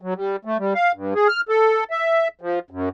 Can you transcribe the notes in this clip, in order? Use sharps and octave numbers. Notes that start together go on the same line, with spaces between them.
F#3
G3
A3
G3
F5
G2
G#4
F6
A4
E5
F3
F#2